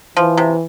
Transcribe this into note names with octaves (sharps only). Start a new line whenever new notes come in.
E3 F3
C3